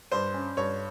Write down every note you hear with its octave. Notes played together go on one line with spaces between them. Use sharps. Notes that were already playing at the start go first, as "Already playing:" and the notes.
G2 C5
C#4
G2 C#5